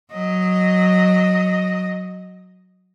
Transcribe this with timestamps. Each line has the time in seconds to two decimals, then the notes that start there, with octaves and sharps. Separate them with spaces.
0.12 F#3 D#5